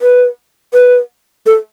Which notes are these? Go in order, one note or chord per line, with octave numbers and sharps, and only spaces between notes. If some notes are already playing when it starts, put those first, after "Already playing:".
B4
B4
A4